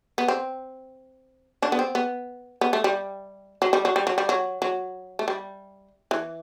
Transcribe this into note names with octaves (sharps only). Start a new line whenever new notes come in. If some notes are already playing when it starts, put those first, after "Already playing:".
B3
C4
D3 D4
B3
C4
B3
B3
A3
G3
F#3
G3
F#3
G3
F#3
G3
F#3
F#3
A3
G3
E3